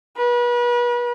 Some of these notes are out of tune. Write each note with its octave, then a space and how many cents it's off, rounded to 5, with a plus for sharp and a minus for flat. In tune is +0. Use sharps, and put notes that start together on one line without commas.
B4 -35